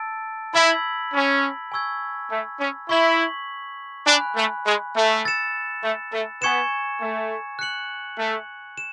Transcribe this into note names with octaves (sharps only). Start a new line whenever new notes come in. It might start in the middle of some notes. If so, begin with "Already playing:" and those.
Already playing: A5 E6 A6 D7
E4 B5 E6 G#6 B6 F#7
C#4
G#5 C#6 E6 G#6
A3
C#4
E4 C#6 G#6 B6 F#7
D4 G#5 B5 F#6
A3
G#3
A3
E6 A6 C#7 E7
A3
A3
B3 G#5 C#6 G#6 C#7 E7
A3
F#6 C#7 F#7
A3
E7